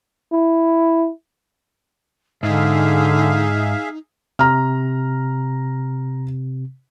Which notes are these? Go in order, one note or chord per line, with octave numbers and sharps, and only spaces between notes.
E4
G#2 D3 D#4 G#4 E5 F5
C3 A#5 F6